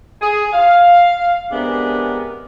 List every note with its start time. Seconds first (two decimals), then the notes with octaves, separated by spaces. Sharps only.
0.22 G#4
0.53 F5
1.52 C3 G#3 B3 D4 G#4 A#4